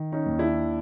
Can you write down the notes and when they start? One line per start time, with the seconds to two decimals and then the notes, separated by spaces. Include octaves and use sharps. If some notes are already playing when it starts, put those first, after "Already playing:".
Already playing: D#3
0.12 C#4 D#4
0.26 D#2
0.39 D4 E4